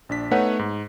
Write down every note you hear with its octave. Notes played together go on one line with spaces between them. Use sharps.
A#1 D4 B6
A3 B3 D#4 B4 C#5 F#5
G#2